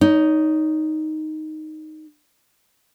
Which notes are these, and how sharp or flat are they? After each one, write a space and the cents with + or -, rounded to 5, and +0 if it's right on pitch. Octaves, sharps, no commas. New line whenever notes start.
D#4 +0 C#5 +30